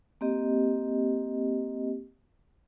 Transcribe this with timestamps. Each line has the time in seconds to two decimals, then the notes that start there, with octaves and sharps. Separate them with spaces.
0.21 A#3 C4 G4 D#5